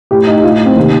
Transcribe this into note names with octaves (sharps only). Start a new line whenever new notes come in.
A2 G4
D#4
A2 F4
D#4
C4
C3 D#3 A#3